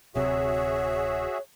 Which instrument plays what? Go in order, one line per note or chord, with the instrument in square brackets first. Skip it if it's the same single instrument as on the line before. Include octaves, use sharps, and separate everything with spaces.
[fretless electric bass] D1 C3 [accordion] F#4 G#4 E5 [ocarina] C#5